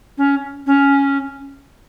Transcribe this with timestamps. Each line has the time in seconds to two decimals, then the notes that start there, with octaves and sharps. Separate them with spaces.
0.18 C#4
0.66 C#4